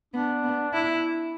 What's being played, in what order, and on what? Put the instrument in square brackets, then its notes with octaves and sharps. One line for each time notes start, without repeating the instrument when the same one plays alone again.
[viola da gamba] B3 [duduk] D4
[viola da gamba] B3
E4